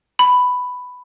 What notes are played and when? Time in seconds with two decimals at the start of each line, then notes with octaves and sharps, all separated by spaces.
0.19 B5